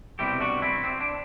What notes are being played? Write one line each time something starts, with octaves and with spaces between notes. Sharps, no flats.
C2 B2 G3 C4 E4 G4
D4 F#4
C4 E4
C4
D4